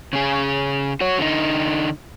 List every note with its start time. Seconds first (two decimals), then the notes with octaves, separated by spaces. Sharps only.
0.13 C#3 G#4
1.01 F#4 C#5
1.19 D3 D#4